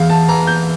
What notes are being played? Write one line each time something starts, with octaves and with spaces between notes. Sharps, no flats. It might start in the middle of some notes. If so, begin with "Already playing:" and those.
Already playing: E2 F5
A5
E3 A#5
G6